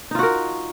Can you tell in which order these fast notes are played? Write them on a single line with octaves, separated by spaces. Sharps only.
D#4 F4 F#4 A#4